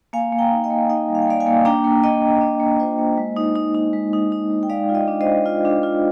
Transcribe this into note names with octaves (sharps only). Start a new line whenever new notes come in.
A#3 F5 G#5
A#3
G5 A#5
D#4
D#5 G5
A#3
D#4 D#5 G5
G3
F5
G5
A#3 D5 F5
F5 G#5
A#3
D4 G5 A#5
A#3
A#3 D#5 G5
A#3
D4
A#3
F4 C5 D#5
A#3
G#3
D#4
D#4
D#4
G#3
D#4
D#4
G#3
G5
G#3 D5 F5
F4
D#5 G5
D4
C5 D#5
D4
F4
D4
F4